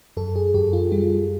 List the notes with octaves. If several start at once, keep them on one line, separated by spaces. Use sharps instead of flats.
F#2 A4
G#4
F#2 G4
F4
G3 F4